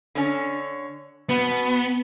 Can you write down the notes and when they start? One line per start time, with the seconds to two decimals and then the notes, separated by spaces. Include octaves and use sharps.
0.15 D3 C#4
1.29 B2 B3